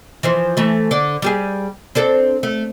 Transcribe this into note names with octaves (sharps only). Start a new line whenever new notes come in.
E3 F3 C5
E3 A3
D3 D5
G3 G4 G#4
C4 D4 A4
A3